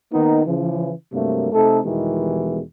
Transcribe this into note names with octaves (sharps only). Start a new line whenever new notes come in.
D#3 A#3 B3 D#4
C#3 E3 F3
G2 C3 F#3 A3 A#3
C3 A3 D#4 A4
E2 B2 D#3 E3 G3 G#3